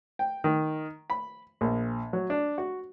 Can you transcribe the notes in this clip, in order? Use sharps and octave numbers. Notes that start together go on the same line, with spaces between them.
G5
D#3
B5
A#1
F#3
D4
F#4